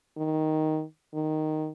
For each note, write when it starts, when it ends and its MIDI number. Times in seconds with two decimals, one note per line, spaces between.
0.17 0.83 51
1.14 1.70 51